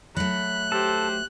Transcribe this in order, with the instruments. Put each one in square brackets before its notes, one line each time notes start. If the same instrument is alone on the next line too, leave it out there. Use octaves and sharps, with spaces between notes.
[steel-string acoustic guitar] F#3 A3 [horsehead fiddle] B5 [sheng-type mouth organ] F#6
[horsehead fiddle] G4 C5 [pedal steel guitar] A4